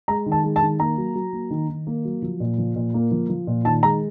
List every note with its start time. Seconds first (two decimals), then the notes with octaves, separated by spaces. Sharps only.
0.08 G#3 A#5
0.26 D#3
0.32 A5
0.44 G#3
0.56 A5
0.62 D#3
0.80 A#3 A#5
0.98 F#3
1.15 F#3
1.33 A#3
1.51 D#3
1.69 D#3
1.87 A#3
2.05 F#3
2.22 F3
2.40 A#2
2.58 F3
2.76 A#2
2.94 A#3
3.11 F3
3.29 F3
3.47 A#2
3.65 D#3 A5
3.83 G#3 A#5